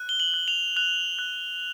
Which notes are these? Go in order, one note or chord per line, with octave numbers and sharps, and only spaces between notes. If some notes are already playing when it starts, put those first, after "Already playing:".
Already playing: F#6
G7
F#7
F#6
F7
F#6 F7
F#6